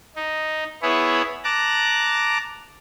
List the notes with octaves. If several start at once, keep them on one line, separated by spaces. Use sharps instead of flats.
D#4
B3 E4 G#4 B4 C#5
A5 A#5 D6 F#6